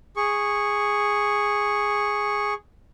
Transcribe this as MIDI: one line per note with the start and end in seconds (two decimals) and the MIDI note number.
0.17 2.54 68
0.17 2.54 85